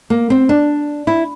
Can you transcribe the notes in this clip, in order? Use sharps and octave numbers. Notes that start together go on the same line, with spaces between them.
A#3
C4
D4
E4